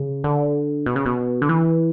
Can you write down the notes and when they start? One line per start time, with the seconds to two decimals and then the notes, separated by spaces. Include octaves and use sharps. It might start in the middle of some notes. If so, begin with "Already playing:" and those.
Already playing: C#3
0.24 D3
0.86 B2
0.96 C#3
1.06 B2
1.42 D3
1.49 E3